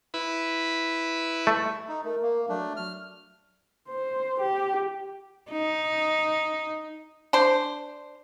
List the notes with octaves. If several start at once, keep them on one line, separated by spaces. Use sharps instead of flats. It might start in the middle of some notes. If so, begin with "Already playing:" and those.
E4 B4
A3
D#4
A3 A#4
A#3
F#3 A3 D4
F6
C5
G4
D#4
D4 C5